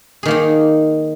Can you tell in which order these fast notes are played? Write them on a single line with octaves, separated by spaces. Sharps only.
G#4 D#3 A#3 D#4